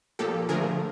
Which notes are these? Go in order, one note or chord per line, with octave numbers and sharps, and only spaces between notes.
A#2 F3 A#3 G4 A4
D3 F3 A3 G#4 A#4